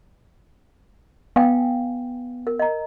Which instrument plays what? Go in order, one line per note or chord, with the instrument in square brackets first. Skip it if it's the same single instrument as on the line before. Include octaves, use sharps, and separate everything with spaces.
[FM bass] B3 [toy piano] F5 G5 G#5
[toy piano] A#4
D#5 A#5